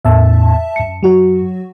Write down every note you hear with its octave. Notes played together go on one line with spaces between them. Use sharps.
E2 A2 E5 A5
F#2 C#7
F#3 F#4